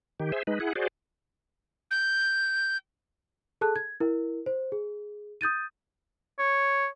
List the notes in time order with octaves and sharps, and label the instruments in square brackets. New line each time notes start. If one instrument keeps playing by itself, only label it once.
[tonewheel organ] D#3 G4
G#4 C5 E5
G#3 D#4 B4
E4 G#4 F#5
F#4 G#4 C5 D5
[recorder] G6
[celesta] G#4 A4 A5 F#6
G#6
E4 A#4
C5
G#4
D#6 G6 A6 D#7
[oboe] C#5